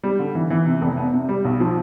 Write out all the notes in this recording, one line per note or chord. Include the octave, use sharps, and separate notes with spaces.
G3
D3
E3
E3
C3
F1
B3
C3
G3
B1
F3